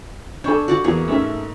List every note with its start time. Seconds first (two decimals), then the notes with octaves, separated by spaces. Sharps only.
0.44 D4 A4 C#5 G#5 C#6 G6
0.68 F#4 D5 F#5
0.84 E2 A#3 G#4 C#5
1.08 G#2 A3 C#4 E5